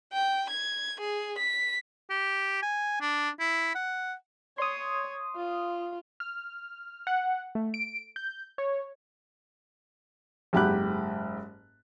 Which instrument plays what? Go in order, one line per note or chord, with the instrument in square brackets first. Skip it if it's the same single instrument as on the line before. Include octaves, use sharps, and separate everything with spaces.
[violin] G5
G#6
G#4
B6
[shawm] G4
G#5
D4
E4
F#5
[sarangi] C#5 [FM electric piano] C6 D#6
[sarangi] F4
[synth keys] F6
F#5
A3
D7
G6
C#5
[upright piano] F#1 G#2 G4 F#5 B5 F#6